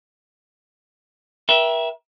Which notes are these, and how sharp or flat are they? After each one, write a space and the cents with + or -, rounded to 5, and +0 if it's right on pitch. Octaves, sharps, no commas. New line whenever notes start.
A#4 +45 E5 +0 G5 -5